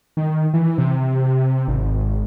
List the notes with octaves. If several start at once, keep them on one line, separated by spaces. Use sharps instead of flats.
D#3
E3
C3
G#1